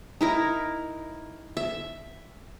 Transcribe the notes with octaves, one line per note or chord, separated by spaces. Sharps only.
D#4 E4 A#4
E5